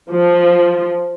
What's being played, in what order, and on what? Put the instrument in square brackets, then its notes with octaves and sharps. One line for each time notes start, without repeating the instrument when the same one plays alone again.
[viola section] F3